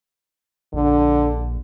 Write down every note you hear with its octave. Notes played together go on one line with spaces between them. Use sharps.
A#1 D3